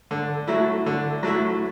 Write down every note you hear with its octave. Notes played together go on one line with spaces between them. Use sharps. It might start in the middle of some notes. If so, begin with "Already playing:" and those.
D3
F#3 A3 E4
D3
F#3 A3 E4